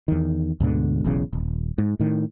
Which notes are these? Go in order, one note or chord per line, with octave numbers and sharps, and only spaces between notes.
E2 D#3
D2 G#2 B2 D3
E1 B1 E2 C#3
D#1
G#2
A2 D#3